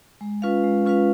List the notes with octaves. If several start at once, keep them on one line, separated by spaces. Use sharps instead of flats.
G#3
C#4 F4 B4 F5
G#3
C#4 F4 B4 F5